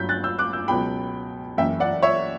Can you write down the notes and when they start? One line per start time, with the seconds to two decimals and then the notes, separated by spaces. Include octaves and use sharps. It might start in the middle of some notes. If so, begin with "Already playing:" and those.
Already playing: G1 G2 F#3 G6 B6
0.09 F#6 A6
0.24 E6 G6
0.39 D6 F#6
0.53 E6 G6
0.68 C#2 B2 F#3 G5 B5
1.58 F#1 F#2 E3 E5 G5
1.80 D5 F#5
2.03 C#5 E5